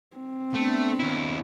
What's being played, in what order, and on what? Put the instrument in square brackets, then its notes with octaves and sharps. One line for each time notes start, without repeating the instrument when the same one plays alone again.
[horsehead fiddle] C4
[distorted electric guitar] A3 [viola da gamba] B3 D4
[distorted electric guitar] D#2 E4